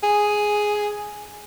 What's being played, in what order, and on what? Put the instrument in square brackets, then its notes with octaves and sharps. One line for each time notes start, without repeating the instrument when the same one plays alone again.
[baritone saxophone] G#4